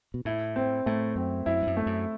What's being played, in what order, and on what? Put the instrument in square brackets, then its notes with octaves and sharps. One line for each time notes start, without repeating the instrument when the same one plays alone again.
[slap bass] B2
[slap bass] A2 [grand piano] E4
[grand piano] C4
[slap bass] A2 [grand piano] A3
[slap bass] F#2 [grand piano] C4
[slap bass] F#2 [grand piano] E4
[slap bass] G2
F#2
[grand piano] A3
[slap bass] F#2